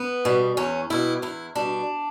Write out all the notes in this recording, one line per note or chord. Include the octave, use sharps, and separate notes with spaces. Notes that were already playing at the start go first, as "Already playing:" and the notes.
Already playing: B3
B2 G3
E2 C#4
B2 G3 E4
E2 E4
B2 G3 D4